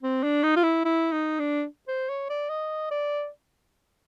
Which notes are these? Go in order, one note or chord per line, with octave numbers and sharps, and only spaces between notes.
C4
D4
D#4
F4
E4
E4
D#4
D4
C5
C#5
D5
D#5
D5